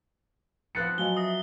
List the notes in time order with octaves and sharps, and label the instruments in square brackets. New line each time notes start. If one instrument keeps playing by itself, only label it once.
[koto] F3 B3 C4 [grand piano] F#6 A6 C#7
[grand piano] F#3 [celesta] D#5 F5 G#5 [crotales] G7
[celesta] E5 A#6 C7 [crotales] D#6